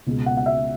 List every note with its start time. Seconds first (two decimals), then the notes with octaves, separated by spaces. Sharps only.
0.06 C#2 B2 G#3 B3
0.26 F#5
0.37 F#5
0.46 E5